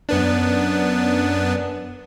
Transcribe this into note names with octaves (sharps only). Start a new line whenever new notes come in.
F#2 B3 D4